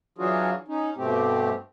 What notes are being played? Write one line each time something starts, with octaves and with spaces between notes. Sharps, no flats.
E3 F#3 D4 F4 F#4 G#4
C#4 D#4
G2 B2 A3 C4 G4